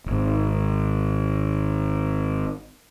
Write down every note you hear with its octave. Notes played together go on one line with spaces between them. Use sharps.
D1 G#1